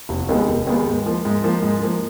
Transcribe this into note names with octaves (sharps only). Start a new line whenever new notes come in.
F1
D#2 D#3 G#3 B3
F1
D#2 D#3 G#3 B3
G#2
F3 A#3
G#2
F3 A#3
G#2
F3 A#3